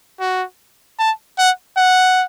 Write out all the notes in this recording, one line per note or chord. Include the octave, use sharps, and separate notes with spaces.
F#4
A5
F#5
F#5